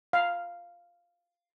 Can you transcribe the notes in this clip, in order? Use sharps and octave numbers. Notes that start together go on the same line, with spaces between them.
F5